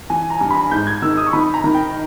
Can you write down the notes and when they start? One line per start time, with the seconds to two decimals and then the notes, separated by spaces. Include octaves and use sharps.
0.10 E3 G#5
0.30 A#5
0.41 G2
0.51 B5
0.71 G#2 G6
0.87 G#6
1.02 D#3 E6
1.17 D#6
1.27 C#6
1.33 D#3 B5
1.54 A#5
1.64 D#3
1.74 G5